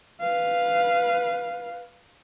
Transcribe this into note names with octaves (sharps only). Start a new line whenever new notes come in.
B4 F5